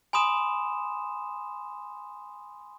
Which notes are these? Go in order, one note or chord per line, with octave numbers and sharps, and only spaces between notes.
G#5 B5 C6 D#6 E7